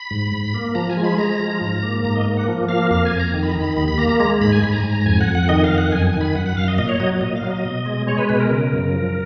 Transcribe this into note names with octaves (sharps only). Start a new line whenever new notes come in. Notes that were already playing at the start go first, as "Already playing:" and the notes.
Already playing: B5
G#2
G#2
A#3
F3 A#5
G#5
G#3
B5
G#3 A#5
F3
G#2
A#3
G#2 A#5
D#5
A#3
F#5
F3
A#3 F5
F2 F5
G#5
F2
A#5
D#3
B5
A#5
D#3
B5
D#2 B5
B5
A#3 A#5
A#5
G#3 A#5
G#2 B5
G#5
G#2 B5
A#5
G#2 G#5
A#5
F2 G#5
F#5
F2
F#5
D#3 D#5
F5
F2
F#5
F#2 G#5
G#5
D#3
B5
F#2 F#5
F#5
F#2 F5
D#5
A#2 D#5
C#5
F#3 D#5
A#2 D#5
F5
F#3
D#5
B2
G#3
G#3 C#5
B4
B2 B4
A#4
C#3
F#2
F3